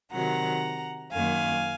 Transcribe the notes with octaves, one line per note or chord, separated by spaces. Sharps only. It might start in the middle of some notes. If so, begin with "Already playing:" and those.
C3 D#3 F#3 F#5 A#5
F#2 D#3 A#3 F5 G#5